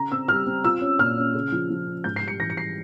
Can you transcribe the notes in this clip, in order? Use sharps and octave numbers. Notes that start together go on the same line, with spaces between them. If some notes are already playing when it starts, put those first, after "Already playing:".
Already playing: C#3 A#5
C4 E6
G3 F6
C4
F4 E6
C#4
A#2 F6
C#4
C#3
F3
F3
C#3
G#2 G6
C7
G3 C#7
E3 A#6
C#7
G3 C7